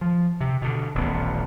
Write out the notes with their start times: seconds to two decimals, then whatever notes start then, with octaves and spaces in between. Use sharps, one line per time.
0.01 F3
0.41 C3
0.62 B2 D3
0.95 D#1 A1 A#2 B3